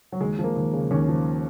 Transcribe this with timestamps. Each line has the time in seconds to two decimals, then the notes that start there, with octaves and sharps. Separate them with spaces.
0.12 F#3
0.21 D#2 G#3
0.38 F3
0.44 A#3
0.56 D#2
0.73 C#3
0.91 D#2 C#4
1.08 F3